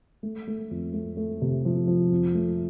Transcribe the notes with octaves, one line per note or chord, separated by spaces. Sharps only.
A3
A3
F2
A3
A3
C3
F3
F3
F2
A3